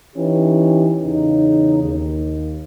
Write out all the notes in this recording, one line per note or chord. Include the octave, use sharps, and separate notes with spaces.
E3 C#4 D#4 G4
E2 C#3 D#4
D#2